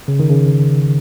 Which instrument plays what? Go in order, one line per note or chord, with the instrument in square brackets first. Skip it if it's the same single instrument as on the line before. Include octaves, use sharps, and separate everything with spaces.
[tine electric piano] C#3
D#3
C#3